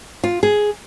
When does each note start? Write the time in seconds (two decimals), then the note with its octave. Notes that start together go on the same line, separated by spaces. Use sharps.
0.24 F4
0.43 G#4